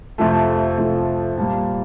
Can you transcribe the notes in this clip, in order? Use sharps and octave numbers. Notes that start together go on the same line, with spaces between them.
F2 C3 F3 A3 A5
F2 C3 F3 A3
A#2 G3 A#3 A5